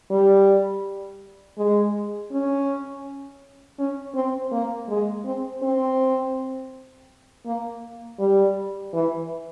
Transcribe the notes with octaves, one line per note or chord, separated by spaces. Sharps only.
G3
G#3
C#4
C#4
C4
A#3
G#3
C4
C4
A#3
G3
E3